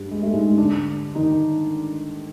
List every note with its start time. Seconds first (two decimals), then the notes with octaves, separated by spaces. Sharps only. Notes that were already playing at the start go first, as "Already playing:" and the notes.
Already playing: G2 G3
0.11 G#3
0.22 A3
0.33 G#2 G#3
0.57 D3 D4
1.15 D#3 D#4